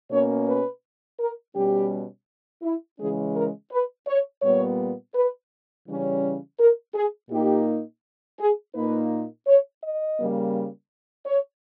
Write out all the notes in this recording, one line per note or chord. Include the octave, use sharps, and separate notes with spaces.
B2 A#3 C#4 C#5
B4
A#4
B2 G3 C#4 G4
E4
C#3 E3 G#3 C#4 G#4
A#4
B4
C#5
A#2 G3 B3 C#5
B4
C#3 E3 G3 C#4
A#4
G#4
A#2 A#3 D#4 G4
G#4
A#2 A#3 D#4 B4
C#5
D#5
C#3 G3 A#3
C#5